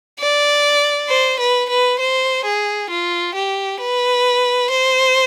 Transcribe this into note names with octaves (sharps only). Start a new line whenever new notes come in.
D5
C5
B4
B4
C5
G#4
F4
G4
B4
C5